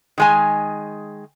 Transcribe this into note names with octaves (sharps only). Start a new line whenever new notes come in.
D#3 G#3 G#5